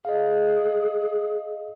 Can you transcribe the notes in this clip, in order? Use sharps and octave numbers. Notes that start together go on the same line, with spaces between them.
G#4 D#5 F5